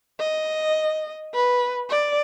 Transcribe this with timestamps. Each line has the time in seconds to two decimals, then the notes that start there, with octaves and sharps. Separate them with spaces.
0.20 D#5
1.34 B4
1.89 D5